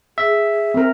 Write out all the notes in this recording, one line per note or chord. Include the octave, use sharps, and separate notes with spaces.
G#4 E5
C4 A#4